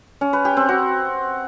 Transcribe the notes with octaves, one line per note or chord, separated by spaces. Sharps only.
C#4
B4
G4
C4
F#4